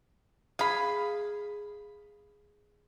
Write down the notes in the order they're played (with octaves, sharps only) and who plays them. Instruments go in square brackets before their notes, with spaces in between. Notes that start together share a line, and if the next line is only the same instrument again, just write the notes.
[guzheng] G#4 [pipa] F5 B5